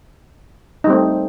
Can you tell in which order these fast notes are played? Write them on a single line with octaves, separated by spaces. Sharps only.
D#4 G3 C4 A3